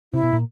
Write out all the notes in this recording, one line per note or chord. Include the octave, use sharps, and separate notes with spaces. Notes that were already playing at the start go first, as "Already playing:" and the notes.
C3 E4
B2
A#2